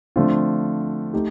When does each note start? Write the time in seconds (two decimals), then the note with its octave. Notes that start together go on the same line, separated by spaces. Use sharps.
0.16 D3 F3 A3 C4 F4
1.14 A3 D#4 G4